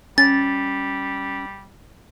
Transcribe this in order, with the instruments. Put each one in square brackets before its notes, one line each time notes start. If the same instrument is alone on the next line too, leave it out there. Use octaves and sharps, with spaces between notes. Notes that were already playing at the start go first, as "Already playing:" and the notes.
[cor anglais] G3 [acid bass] C#4 [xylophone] A6